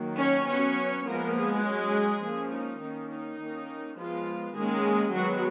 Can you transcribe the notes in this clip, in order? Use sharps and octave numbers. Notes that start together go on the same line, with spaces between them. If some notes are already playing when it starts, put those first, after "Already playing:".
Already playing: D#3 F#3 A#3
C#4 C#5
F#3 B3 C#4 C#5
F3 G#3 A#3 B3 A#4
G#3 G#4
F#3 C#4
F3 A#3 C#4
D#4
D#3 A#3 C#4
D#4
D#3 A#3 C#4
F3 G#3 B3 F4
D#3 G#3 A#3 C#4 G#4
D#3 F#3 G#3 B3 F#4